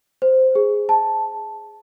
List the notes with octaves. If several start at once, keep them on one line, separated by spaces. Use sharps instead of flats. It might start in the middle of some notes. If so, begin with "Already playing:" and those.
C5
G#4
A5